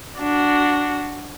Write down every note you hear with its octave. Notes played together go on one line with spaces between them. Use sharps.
D4 F#4